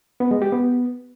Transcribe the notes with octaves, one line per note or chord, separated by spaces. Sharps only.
B3
G#3
G4
B3